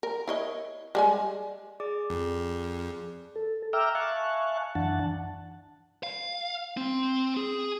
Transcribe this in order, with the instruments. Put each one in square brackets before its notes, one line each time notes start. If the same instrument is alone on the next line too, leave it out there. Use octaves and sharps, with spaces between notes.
[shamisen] A#4
E4 C#5 D#5
G3 G#3 G#5
[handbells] G#4 D5 D6
[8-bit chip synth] F2
[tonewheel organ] A4
E5 G5 A#5 D6 E6 F6
E5 F5 G#5 A5 C#6 F#6
F#2 E3 D4 F#5 A5
[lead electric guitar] F5
C4
G#4